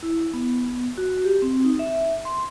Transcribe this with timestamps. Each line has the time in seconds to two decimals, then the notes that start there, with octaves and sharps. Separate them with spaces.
0.03 E4
0.34 B3
0.98 F#4
1.24 G4
1.42 C4
1.64 D#4
1.79 E5
2.25 C6